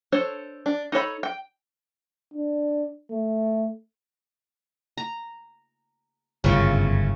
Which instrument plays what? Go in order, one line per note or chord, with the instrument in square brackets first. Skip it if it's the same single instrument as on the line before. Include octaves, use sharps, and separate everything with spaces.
[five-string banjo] D4 A4 C5 C#5
D4
D#4 A4 C#5 B5
G5
[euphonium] D4
A3
[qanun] A#5
[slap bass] G1 F#2 A2 [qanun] C#3 C4 F4